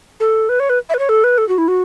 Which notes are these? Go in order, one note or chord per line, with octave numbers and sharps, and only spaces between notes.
A4
B4
C#5
B4
E5
B4
C#5
A4
B4
A4
F#4
E4
F#4